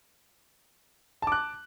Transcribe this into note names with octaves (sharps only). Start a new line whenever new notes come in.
A5 D6 F#6